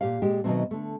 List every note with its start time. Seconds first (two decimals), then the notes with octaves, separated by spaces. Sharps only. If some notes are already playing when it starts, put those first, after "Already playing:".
0.01 A#2 G4 F5
0.22 A#2 G#3 G4
0.44 B2 D#3 E3 F#3 A3 C4
0.71 D3 A3